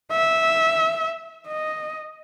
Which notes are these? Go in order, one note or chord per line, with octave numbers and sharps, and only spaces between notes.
E5
D#5